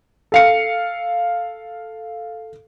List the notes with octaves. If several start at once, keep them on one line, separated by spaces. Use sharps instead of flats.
A4 F5 C#7